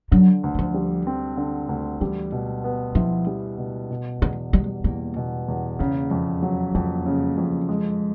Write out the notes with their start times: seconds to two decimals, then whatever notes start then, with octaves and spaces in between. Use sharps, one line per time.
0.11 D3 F#3
0.44 D2
0.55 E3
0.59 F3
0.74 G3
1.07 C4
1.37 D3
1.69 D2
2.01 E3 G3
2.32 B2
2.64 B3
2.95 F3 E4
3.27 G3
3.58 B2
3.91 B2
4.22 E2 G#3
4.53 G3 G#3
4.84 E2 A#3
5.16 B2
5.48 E2
5.79 C#3 A#3
6.11 F2
6.42 F#3
6.74 F2 A#3
7.06 C#3
7.37 F2
7.69 G#3